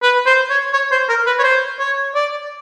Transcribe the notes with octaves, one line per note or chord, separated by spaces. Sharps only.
B4
C5
C#5
C#5
C5
A#4
B4
C#5
C5
C#5
D5